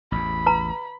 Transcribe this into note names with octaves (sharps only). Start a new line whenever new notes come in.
A1 E2 B5
B4 A#5